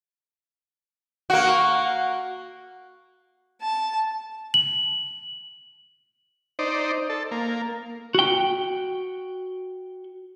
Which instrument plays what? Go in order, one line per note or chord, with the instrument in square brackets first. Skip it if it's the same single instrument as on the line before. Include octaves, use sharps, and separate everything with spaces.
[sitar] A#3 F#4
[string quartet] A5
[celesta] F#7
[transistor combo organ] D#4 C5 D5
A4
A#3
[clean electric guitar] F#4 G5